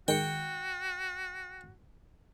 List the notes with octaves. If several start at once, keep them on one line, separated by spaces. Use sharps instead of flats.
D#3 G#3 F#4 G5 C#7